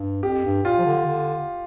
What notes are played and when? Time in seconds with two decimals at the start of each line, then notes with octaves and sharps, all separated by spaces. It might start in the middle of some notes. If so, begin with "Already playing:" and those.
Already playing: G2
0.23 F2 G4
0.44 G2
0.64 A#2 F4
0.78 F3
0.85 D3
1.05 D3